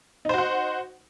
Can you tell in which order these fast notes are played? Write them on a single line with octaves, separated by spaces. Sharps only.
D#4 C5 F#4 F#5